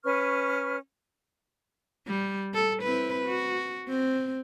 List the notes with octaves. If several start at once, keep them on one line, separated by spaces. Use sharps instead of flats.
C#4 B4 C#6 F6
G3
A4
C4 E4 B4
F#4
C4